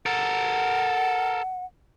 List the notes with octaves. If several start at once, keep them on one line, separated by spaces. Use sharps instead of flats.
A4 A#4 F#5